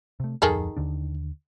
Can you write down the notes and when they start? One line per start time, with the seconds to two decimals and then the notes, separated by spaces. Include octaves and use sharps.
0.20 C3 A3
0.42 D1 F2 D#3 G#4 A4
0.77 D#2 D3 D4